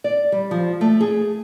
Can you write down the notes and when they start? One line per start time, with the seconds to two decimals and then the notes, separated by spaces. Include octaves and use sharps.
0.04 D5
0.32 G3
0.51 F3
0.81 A3
1.01 G#4